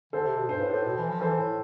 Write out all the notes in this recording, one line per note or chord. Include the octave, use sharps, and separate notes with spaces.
D3 A4 C5
C3
B2
G2 C5
A2 B4
A2 A4 C5
B2
E3
F3
E3 A4 C5
A2